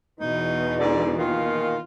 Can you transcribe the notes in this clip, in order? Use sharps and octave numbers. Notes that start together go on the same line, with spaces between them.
E2 B2 D#4
G#2 D3 D5
D#2 A#2 D#3 F4